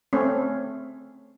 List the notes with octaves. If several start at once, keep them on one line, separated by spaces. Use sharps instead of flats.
A3 C4 C#4